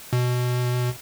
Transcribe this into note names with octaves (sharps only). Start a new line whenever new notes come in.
B2